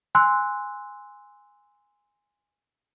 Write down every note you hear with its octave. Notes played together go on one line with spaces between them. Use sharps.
G#5 C6 E6 F#6